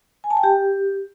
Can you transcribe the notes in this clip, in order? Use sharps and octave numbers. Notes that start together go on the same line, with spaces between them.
G#5
A5
G5
G4